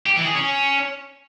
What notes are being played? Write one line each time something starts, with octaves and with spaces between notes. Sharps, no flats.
G4
E3
G#4
C#4